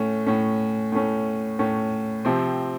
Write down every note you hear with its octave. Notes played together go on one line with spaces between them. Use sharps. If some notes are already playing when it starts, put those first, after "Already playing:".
Already playing: A2 A3 C#4
A2 A3 C#4
A2 A3 C#4
A2 A3 C#4
C3 F3 C4